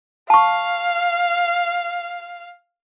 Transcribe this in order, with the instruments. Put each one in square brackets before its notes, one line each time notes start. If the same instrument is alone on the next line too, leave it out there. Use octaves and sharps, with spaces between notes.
[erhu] F5 [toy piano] A5 C#6